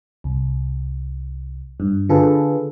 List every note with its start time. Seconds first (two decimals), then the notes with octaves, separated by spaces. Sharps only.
0.24 C2
1.80 G2
2.09 D3 F4 G#4 A4 B4